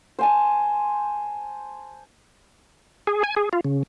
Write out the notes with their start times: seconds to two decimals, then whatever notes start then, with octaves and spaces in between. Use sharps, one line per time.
0.19 C5 G#5 A5
3.07 G#4
3.24 G#5
3.37 G#4
3.53 F4
3.65 C#3